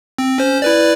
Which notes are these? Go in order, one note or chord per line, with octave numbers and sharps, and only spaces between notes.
C4
C#4 C5
E4 B4 D5